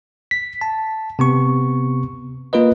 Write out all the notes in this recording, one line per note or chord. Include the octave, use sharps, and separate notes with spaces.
B6
A5
C3 B3 C#6
A#3 F4 A#4 B4 D#5